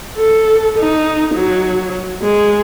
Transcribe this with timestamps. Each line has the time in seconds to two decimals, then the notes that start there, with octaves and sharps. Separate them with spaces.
0.17 A4
0.78 D#4
1.35 F#3
2.22 G#3